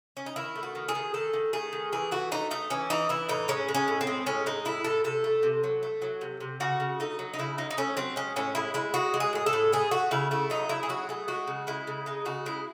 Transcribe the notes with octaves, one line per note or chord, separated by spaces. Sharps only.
C#4
D#4
D#3 E4
A3
F#4
D#3
G#4
D#3
D#3 A4
D#3
A3 G#4
D#3
E3 G#4
A3 F#4
A3 D#4
A3 D#4
E3 C#4
E3 D#4
E3 E4
A2 D#4
G#3 C#4
G#3
C#4
A2
C4
G#3
A2 C#4
G#3 D#4
A2 E4
A2 A4
C3 A4
A3
C3
F#3
A3
F#3
C3
C3
C#3 F#4
C#3
A3 D#4
F#3
D#4
C#3 E4
F#3 D#4
D#4
A3 C#4
F#3 C4
G#3 C#4
A2 C#4
G#3 E4
G#3 E4
G#3 F#4
G#3
G#4
A2 G#4
A4
A2
A3 G#4
A3 F#4
C#3 E4
A3 E4
F#3 D#4
C#3 E4
G#4
F#3 F#4
A3 G#4
G#3 F#4
C#3
G#3 E4
C#3
G#3 D#4
C#3 F#4
G#3 E4